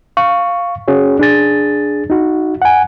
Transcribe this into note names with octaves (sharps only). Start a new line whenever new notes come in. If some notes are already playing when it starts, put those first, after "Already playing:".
F5 C#6
C#4 F#4 G#4 C#5
D4 G#4 A6
D#4 F#4
F#5 G#5